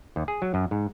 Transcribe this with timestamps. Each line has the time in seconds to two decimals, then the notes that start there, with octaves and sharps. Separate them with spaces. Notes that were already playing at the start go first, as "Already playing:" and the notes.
0.16 D#2
0.28 G#4
0.42 F#3
0.54 F#2
0.71 G#2